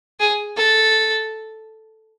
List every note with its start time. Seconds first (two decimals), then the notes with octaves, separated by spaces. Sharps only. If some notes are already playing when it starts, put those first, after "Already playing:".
0.20 G#4
0.57 A4